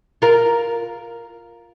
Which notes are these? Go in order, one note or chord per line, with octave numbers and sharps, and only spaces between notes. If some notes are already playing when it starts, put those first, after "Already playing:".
F4 A#4